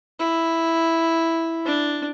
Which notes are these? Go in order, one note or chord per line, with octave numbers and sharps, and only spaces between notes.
E4
D4